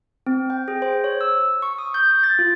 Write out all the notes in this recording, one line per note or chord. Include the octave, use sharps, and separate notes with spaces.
C4
G5
G#4
C5
C#5
E6
C#6
D#6
G6
A6
F4